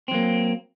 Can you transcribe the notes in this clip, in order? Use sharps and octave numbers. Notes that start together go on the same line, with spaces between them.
F#3 A#3 C4